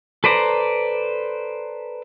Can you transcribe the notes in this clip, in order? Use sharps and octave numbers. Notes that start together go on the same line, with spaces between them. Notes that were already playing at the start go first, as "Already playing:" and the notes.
A4 B4 C5 D5 A#5